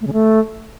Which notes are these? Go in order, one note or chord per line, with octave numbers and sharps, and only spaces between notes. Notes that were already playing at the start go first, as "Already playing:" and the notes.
A3
C#3
A3